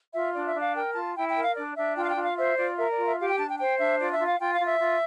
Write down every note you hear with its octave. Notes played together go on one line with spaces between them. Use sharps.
F4 E5
D4 D5
E5
D4
F5
A#4 G5
F4 A5
E4 G5
G5
A#4
F5
D4 D5
D4 E5
F4 G5
F5
G5
F4
F5
C5 E5
F4 D5
A#4 E5
D5
F4
E5
G4 F5
G5
D4 A5
G5
C5 G5
D4 E5
F4 D5
E5
F4
F5
F4 G5
F5
F4
E5
F4